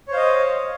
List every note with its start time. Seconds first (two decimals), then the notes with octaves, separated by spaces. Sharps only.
0.08 C#5
0.11 C5
0.14 F5
0.17 D#5